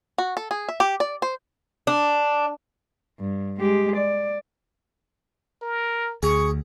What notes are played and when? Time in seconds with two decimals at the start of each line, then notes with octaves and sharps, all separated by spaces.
0.18 F#4
0.37 A4
0.51 G#4
0.69 E5
0.80 G4
1.00 D5
1.22 C5
1.87 D4
3.20 G2
3.60 G#3 G4
3.96 D5
5.62 A#4
6.23 D2 G#4 C#6